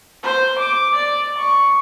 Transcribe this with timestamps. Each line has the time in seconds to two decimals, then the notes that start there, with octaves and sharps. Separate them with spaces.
0.23 C5
0.59 D6
0.95 D5
1.38 C#6